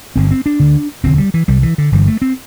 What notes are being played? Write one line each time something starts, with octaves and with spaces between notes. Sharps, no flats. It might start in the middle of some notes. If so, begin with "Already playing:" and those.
G1 G2 D3 C4
C4
D4
D2 D3
E1 D2 D3 C4
G3
E3
C2 C3 G3
E3
D3
G1 G2 D3 E3
A3
C4